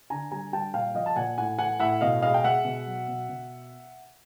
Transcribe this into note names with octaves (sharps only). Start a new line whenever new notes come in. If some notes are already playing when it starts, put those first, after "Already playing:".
D3 G#5 A#5
G3 G#5 A#5
G3 G5 A5
A#2 F5 G5
F3 D#5 F5
A5
A#2 F#5 G#5
A2 F#5 G#5
E3 F#5 G#5
A2 E5 F#5
B2 D#5 F5
G#3 D#5 F5
G5
G#3 E5 F#5
B2
F#3
B2
B2